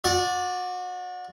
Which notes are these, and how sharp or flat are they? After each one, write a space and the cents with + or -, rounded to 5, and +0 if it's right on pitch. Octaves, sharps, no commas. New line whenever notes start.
F#4 -30 D5 +0